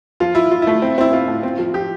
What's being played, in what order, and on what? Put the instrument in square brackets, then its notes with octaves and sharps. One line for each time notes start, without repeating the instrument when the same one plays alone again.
[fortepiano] F3 [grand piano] F4
[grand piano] E4 [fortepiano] F4
[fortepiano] F4
[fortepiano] A3 [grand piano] E4
[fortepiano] C4
[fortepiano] C4 [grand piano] E4
[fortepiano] C4 [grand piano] F4
[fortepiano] A2
C4
F3
[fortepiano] F3 [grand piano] G4